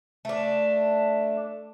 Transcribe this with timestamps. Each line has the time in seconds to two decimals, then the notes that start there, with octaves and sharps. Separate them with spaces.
0.25 A3 D4